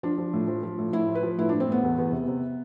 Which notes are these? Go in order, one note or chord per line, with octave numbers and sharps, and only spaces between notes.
F3 D4
F3
A2
F3
F3
A2
A2 E4
F3
B4
F3
A2 E4
A2 D4
C4
A2 B3
E2
E2
C3
C3